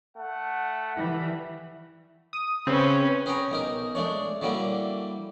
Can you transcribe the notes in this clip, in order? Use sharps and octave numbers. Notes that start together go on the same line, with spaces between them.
A3 F#5
E3 G3
D#6
C#3 C4 C#4 B4
C#4 G#4 B4 G5 G#5 A#5
B1 D#4 A#4
G#3 A3 D4 C#5
D3 F#3 G3 A#3 E4